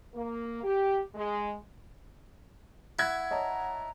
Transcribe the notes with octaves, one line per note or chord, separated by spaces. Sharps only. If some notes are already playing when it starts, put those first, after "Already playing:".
A#3
G4
G#3
E4 F#5 F#6 G#6
C#5 D#5 A5 A#5